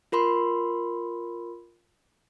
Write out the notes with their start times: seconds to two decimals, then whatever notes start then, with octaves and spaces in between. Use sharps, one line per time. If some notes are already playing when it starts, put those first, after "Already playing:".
0.12 F4 A#4 B5 C6